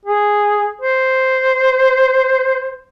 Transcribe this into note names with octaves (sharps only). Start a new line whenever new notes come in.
G#4
C5